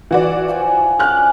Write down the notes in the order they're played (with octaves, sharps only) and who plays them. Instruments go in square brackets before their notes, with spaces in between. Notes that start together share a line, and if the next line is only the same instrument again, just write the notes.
[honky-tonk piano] E3 F#4 D5
[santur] F3 G5 G#5
[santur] C#4 D4 D6 [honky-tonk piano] F6 F#6